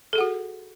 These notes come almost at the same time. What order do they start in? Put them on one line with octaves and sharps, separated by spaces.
A4 G#4 F#5 F#4